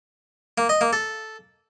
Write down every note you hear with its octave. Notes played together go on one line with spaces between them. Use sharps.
A#3
D#5
A#3
A4